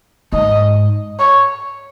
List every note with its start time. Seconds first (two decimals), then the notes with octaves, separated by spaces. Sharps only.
0.32 G#2 D#5
1.19 C#5